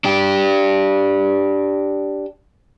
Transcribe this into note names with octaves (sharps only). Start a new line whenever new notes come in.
D4 G4